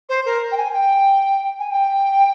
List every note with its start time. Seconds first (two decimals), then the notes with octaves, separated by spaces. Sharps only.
0.09 C5
0.25 A#4
0.51 G5
0.57 G#5
0.73 G5
1.59 G#5
1.70 G5